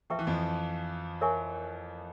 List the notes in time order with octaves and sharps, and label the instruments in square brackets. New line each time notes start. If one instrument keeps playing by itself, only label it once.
[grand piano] F3 [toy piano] B4 E5 G5 A#5 C#6
[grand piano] E3
F2 F3
[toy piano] A#4 C#5 E5 G#5 C#6